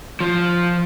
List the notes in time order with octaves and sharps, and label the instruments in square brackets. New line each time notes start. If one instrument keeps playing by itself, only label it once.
[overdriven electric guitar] F3